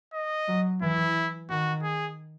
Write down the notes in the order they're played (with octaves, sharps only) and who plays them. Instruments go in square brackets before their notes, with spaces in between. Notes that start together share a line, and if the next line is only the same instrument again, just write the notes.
[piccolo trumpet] D#5
[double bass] F#3
[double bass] E3 [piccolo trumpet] E4
[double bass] D#3 [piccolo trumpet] F#4
[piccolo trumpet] G#4